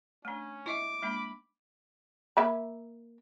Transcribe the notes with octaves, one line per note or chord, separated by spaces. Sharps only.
A3 C#4 D4
E4 D#5 E5 D6
G#3 A#3 D4 B5
A#3 E5 B5